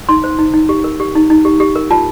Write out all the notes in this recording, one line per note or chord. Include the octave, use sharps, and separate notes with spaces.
D#4 C6
C5
D#4
D#4
G4
A#4
G4
D#4
D#4
G4
G4
A#4
F4 A5